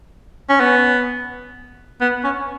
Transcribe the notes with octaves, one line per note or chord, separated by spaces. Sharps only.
C#4
B3
B3
C#4